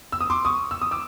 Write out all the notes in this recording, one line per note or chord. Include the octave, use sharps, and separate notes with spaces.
E6
D#6
C6 D6
C#6 D#6
E6
D#6
D6 E6